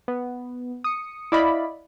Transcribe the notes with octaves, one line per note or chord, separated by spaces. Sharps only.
B3
D#6 C#7
E4 D5 D#5 F5 B5